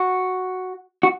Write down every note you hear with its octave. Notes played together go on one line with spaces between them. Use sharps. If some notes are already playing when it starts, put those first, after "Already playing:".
Already playing: F#4
F#4